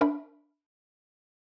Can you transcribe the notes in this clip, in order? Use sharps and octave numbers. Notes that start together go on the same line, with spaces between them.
D4 A#4 E5 B5